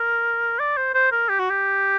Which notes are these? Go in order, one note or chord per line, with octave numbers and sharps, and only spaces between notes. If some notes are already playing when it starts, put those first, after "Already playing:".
Already playing: A#4
D5
C5
C5
A#4
G4
F#4
G4